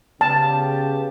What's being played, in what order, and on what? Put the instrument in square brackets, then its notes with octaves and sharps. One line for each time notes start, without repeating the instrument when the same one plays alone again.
[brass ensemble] C#3 B3 G4 [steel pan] A5